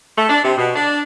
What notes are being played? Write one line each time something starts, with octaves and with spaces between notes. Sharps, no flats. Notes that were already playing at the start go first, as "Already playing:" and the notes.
A3
D4
C3
B2
D4